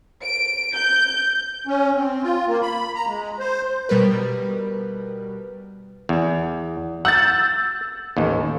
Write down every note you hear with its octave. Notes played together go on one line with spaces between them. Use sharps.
D7
G6
C#4
C4
F4
A#3
B5
A#5
G#3
C5
B2 G3 A#4 B4
E2
F#5 E6 G6 A6
A1 D#2